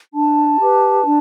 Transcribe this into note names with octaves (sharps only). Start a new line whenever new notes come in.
D4 A5
G4 B4
D4